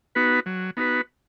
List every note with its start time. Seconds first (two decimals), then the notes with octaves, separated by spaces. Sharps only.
0.15 B3 D#4 F#4 B4
0.46 F#3
0.77 B3 D#4 F#4 B4